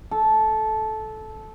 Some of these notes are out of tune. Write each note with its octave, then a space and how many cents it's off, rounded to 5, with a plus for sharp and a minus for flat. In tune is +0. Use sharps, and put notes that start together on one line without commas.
A4 -15